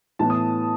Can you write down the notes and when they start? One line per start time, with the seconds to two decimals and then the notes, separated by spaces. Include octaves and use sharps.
0.19 A2 E3 B3 A5
0.30 D#6